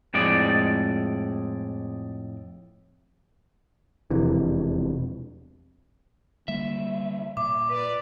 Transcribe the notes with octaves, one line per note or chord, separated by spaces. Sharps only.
F2 A2 G#3 D5
E1 F2 C3 E3
D3 G3 A#3 E5
A#2 D6
B4 D5